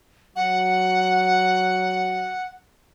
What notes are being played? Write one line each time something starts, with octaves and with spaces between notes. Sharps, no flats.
F#3 F#5